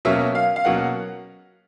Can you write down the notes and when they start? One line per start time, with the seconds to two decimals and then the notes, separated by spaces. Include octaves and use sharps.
0.05 B2 F#3 A#3 C#4 E5
0.35 F5
0.56 F5
0.65 B2 F#3 A#3 C#4 F#5